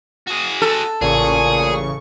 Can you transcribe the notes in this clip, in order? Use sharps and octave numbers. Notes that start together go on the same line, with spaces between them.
F#4 G#4
A4
A1 A#2 C#3 G#4 C#6